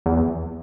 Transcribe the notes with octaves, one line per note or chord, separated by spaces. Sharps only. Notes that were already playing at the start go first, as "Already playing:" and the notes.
E2